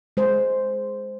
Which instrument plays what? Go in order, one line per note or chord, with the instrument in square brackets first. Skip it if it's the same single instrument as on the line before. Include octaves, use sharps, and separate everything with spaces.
[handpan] G#3 C5